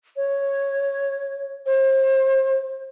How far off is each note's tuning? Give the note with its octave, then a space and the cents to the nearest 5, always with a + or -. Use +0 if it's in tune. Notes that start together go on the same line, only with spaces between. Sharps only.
C#5 -5
C5 +35